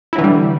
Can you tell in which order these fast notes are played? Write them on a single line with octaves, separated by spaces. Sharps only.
E4 F#3 E3 D3 G3